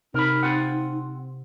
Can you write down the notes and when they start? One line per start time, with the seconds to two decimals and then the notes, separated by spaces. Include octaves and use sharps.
0.14 C3 D#4 A#4 B5
0.43 C4 F4 F#5